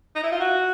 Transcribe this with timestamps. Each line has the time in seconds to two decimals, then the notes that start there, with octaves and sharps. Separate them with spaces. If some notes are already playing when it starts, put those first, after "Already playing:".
0.15 D#4
0.23 E4
0.32 F4
0.40 F#4